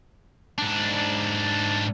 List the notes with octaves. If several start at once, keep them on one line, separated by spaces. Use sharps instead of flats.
G#2 D4